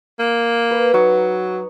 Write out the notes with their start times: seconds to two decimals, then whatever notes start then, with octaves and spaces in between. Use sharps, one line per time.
0.19 A#3
0.71 B4
0.94 F#3 D#4 C#5